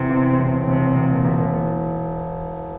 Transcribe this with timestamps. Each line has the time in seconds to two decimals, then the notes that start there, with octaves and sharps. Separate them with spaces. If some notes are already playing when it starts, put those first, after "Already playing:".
Already playing: E2 C3
0.10 E2
0.39 E1
0.67 E1 C3
0.95 E1
1.10 A#2
1.24 E1